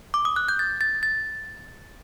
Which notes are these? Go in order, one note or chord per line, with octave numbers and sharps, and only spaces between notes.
D6
D#6
F#6
G6
A6
A6
A6